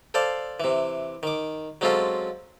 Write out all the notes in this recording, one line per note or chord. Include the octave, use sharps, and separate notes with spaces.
A4 C5 D5 F5 A5
C3 E3
D#3 D6
F#3 G#3 C4 C#4 F4 A4